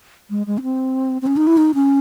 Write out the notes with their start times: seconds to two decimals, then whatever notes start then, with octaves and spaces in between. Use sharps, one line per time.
0.30 G#3
0.47 G#3
0.58 C#4
0.62 C4
1.22 C4
1.27 C#4
1.37 D#4
1.47 E4
1.57 D#4
1.74 C#4